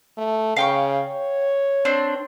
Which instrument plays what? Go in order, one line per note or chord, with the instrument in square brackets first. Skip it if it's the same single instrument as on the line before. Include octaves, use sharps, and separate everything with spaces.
[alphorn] A3
[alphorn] C#3 [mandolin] F5 G5 C#6
[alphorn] C#5
[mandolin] C4 D4 C5